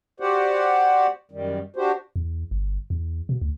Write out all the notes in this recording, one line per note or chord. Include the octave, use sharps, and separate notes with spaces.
F#4 G4 C5 D5 F#5
F#2 D#3 G3
D4 F#4 G4 C5
E2
G1
E2
B2
D2